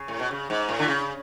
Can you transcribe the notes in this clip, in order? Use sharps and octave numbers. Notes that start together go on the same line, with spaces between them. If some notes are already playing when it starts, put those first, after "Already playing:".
Already playing: C#3
A2
B2
C#3
G#2
A2
D3
C#3